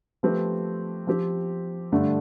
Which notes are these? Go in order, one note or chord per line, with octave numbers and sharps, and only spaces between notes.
F3 A3 C4 G4 B4
F3 C4 G4
G2 D3 A3 D4